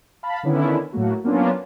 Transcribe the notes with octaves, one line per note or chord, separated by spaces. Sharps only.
F5 A5 B5
D3 D#3 B3 C#4 D4 E4
A2 F#3 A3 A#3 F#4
F#3 A#3 B3 C#4 D4 F4